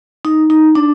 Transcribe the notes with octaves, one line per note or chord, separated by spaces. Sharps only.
D#4
D#4
D4